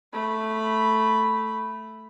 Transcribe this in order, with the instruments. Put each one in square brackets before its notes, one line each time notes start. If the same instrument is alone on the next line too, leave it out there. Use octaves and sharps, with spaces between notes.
[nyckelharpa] A3 B5